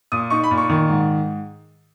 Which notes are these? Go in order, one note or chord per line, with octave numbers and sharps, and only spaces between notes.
A#2 D#6
D#4 C#6
B5
A#2
C#6
D#3
G#2